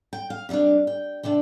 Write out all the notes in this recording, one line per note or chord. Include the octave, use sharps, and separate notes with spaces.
G5
F5
C3 G3 D4 F5
G5
C3 G3 D4 G5